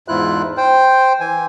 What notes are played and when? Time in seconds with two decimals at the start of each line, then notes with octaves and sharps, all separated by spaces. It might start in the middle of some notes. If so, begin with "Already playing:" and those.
0.08 E2 G#2 E4 F4 F#6
0.57 C5 G5
1.20 E3 G#5